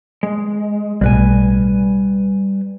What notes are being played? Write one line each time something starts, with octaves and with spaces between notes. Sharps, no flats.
G#3
B1 A2 G3 B4 G#5